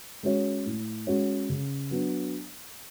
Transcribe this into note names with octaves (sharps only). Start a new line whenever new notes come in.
G#3 C#4 F#4 C#5
A2
G#3 C#4 F#4 C#5
C#3
F#3 B3 D4